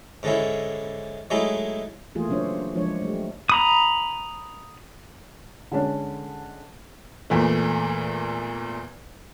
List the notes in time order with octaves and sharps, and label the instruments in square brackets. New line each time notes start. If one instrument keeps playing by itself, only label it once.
[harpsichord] G#2 D3 G#3 C#4 E4
F#3 G#3 A3 D#4 E4 G#4
[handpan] E3 A3 A#3 F4 G#4
C#3 F#3 C#4 D4 C5 C#5
F3 G#3 D4 C#5
G3 A3
[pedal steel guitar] A#5 B5 D#6
[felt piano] D3 G#3 C#4 D4
[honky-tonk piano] E2 A#2 E3 A3